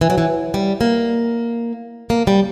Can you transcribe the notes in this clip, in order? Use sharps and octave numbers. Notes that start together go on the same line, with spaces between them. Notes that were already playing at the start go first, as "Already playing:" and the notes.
E3
F#3
E3
G3
A#3
A#3
G3